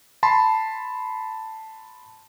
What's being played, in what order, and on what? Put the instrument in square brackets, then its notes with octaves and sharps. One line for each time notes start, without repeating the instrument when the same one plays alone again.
[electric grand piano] A5 B5 C6